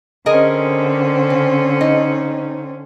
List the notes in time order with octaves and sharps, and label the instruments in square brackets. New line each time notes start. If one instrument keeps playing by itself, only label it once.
[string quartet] D3 C4 C#4 [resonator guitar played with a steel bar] G#4 A#4 D#5
[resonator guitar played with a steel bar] C#3
D#4